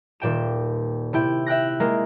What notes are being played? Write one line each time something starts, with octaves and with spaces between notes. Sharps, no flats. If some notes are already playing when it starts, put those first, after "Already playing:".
D#1 A#2 G5 E7
C3 E4 G5
E5 G5 F#6 A#6
G#3 A#3 A#4